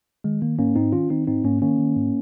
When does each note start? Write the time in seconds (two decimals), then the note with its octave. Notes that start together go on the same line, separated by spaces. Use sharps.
0.24 D#3 G#3
0.42 D#3 A#3
0.59 G#2 A#3 C#4
0.76 G#2 C4 D#4
0.93 D#3 C#4 F4
1.10 D#3 C4 D#4
1.27 G#2 C4 D#4
1.44 G#2 A#3 C#4
1.62 D#3 A#3 C#4
1.79 D#3
1.97 G#2